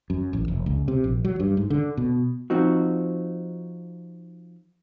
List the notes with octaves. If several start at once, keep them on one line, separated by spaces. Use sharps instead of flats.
F#2
A1
F1
C#2
C3
A#1
F#3
G2
G#2
D3
B2
F3 C4 D#4 F#4